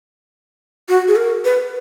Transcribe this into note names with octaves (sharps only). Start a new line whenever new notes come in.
F#4
G#4
A#4
B4